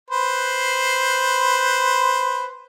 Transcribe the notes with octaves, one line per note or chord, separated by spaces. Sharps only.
B4 C5